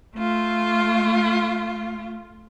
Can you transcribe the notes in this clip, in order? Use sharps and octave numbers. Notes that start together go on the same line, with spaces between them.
A3 F4